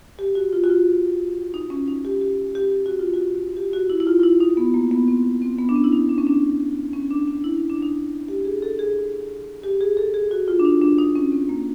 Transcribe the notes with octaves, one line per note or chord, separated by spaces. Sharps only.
G4
F#4
F4
F#4
F4
D#4
C#4
D#4
G4
G4
G4
G4
F#4
F4
F#4
G4
F#4
E4
E4
F4
F4
E4
D#4
B3
A#3
B3
C4
C4
B3
D4
C#4
E4
D#4
D4
C#4
D4
C#4
D4
D4
E4
D#4
D4
D#4
G4
G#4
A4
G#4
G4
G#4
A4
G#4
F#4
F4
D4
D#4
D4
D#4
C#4
C4
A#3